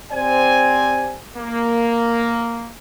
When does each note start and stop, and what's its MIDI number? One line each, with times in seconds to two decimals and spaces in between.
0.12 1.19 60
0.12 1.19 67
0.12 1.19 72
0.12 1.19 74
0.12 1.19 80
1.37 2.71 58